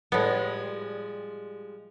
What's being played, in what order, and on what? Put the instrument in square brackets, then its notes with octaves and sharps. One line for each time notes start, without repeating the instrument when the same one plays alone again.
[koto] A2 B3 [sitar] F3 G3 G#3